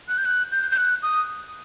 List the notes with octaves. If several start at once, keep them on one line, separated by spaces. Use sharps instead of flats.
F#6
G6
F#6
G6
G6
F#6
D#6